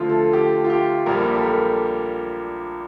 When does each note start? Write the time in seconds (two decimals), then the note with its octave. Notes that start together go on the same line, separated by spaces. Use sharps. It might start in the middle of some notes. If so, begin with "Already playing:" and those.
Already playing: D2 D3 F3 F4
0.09 A4
0.33 G4
0.64 F4
0.70 G4
1.06 A#1 A#2 G3 A#4
1.25 G4
1.34 A4
1.43 A#4